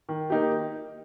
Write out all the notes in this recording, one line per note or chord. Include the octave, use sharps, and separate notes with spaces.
D#3
A#3 D#4 G4